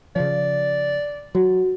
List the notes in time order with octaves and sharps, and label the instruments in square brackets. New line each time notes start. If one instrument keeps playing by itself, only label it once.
[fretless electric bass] C#3 F3 [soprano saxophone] D5
[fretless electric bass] F#3 [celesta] F#4